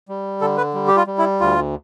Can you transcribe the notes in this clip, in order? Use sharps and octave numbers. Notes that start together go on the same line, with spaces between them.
G3
D3 A4
B4
G3
G4
F4
G3
E4
D2 F4